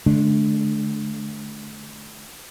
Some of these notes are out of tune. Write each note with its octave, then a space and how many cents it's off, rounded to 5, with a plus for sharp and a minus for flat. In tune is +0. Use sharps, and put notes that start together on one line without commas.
D3 +0 A3 -45 D4 +0